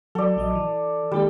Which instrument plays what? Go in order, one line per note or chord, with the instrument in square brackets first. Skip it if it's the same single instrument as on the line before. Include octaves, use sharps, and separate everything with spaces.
[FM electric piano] F#3 [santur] A4 D5
[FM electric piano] A#1 F#3 D#5
E3
[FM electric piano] D#3 G#3 A#3 [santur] G3